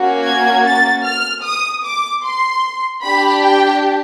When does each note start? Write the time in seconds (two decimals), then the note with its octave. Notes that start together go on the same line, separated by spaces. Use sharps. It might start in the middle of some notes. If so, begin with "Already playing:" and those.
Already playing: A#3 C#4 F#4
0.25 G#6
0.66 A6
1.04 F6
1.44 D#6
1.84 D6
2.24 C6
3.03 D4 G4 B5
3.44 G5